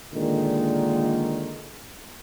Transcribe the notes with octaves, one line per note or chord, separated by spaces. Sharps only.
A#2 D3 D#3 G#3